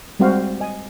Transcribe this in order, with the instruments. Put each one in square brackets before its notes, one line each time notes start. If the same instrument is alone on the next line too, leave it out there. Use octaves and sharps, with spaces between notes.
[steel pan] G3 G#3 C4 F#4 C5 F5
D#5 G#5